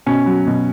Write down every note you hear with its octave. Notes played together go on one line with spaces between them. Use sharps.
B2 C#4
F#3
B2